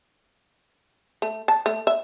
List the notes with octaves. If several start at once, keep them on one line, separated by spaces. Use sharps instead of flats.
A3
A5
A3
E5